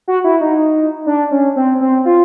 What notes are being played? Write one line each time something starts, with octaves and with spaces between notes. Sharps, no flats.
F#4
E4
D#4
D4
C#4
C4
C4
F4